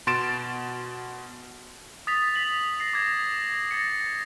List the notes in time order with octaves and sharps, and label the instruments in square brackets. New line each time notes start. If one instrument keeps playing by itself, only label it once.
[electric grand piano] B2 C6 A6 D7 E7
[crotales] D#6 A6 B6 F7
B6 F7 F#7
A#6 C7
D6 G#6 A#6
A6 A#6 C#7